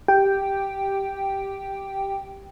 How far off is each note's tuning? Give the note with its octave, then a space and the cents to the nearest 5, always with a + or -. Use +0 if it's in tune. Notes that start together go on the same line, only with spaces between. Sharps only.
G4 +0 G5 +0